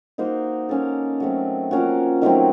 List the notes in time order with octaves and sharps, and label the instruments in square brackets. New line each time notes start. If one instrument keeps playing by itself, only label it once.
[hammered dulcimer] A#3 D#4 F#4 C5
A#3 C#4 A4
F#3 A3 C4
F3 A#3 C#4 F#4
D#3 F#3 A3 C4